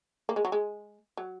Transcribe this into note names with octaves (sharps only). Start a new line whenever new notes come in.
A#3
G#3
F#3
G#3
F#3